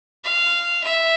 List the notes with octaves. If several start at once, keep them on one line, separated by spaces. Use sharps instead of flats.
F5
E5